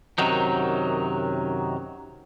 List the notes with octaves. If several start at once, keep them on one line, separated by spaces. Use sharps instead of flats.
F#2 C3 D#3 F#3 D#4